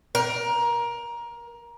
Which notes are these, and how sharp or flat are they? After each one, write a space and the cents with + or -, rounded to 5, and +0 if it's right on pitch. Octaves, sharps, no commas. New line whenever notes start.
A#4 +20